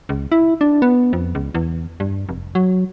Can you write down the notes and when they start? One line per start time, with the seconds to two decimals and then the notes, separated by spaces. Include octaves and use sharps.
0.09 C#2
0.32 E4
0.61 D4
0.82 B3
1.13 F2
1.35 C#2
1.54 E2
2.00 G2
2.29 F1
2.55 F#3